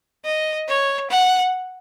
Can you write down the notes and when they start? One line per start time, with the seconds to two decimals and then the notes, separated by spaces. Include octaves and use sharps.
0.25 D#5
0.68 C#5
1.10 F#5